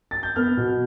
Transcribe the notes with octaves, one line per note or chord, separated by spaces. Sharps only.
A6
G6
B3 F6
B2